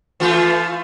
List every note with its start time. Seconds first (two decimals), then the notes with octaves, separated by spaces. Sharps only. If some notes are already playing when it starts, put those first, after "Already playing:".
0.20 E3 A3 F4